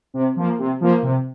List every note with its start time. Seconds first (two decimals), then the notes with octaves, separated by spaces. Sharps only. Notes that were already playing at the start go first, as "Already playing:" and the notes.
0.14 C3
0.36 F3 A#3
0.59 C3
0.81 F3 A#3
1.03 C3